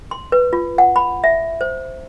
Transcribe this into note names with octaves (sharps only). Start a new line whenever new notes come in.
C6
B4
F4
F#5
B5
E5
C5